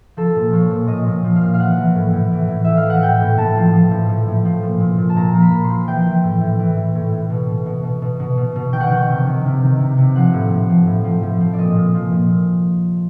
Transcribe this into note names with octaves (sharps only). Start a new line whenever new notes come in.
F3 A4
A#2
F3 C#5
A#2
A#2 D#5
A#2
F3
F5
A#2
F5
E3 F#5
E3
A2
A2
E3
A2
E3 E5
F5
E3
F#5
A2 G5
A2
A2 A5
F3
F3
A2
A2
A2
F3
A#2
A#2
A#2
A5
A#2 A#5
F3
B5
A#2
C6
F3
E3 G5
E3
A2
A2
E3
A2
A2
A2
B2
B2
B2
B2
B2
B2
B2
B2
D#3 G5
F#5
D#3 G5
C3
D#3
C3
D#3
C3
C3
F3 F#5
A2
A2
F3
A2
F3
A2
F3
D5
A#2 D#5
A#2
F3
A#2